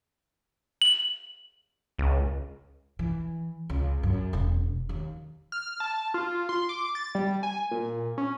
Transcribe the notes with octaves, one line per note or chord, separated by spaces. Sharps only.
F#7
C#2
E3
C#2
F#2
E1
D#2
F6
A5
F4
C6
D6
A6
G3
G#5
A#2
C#4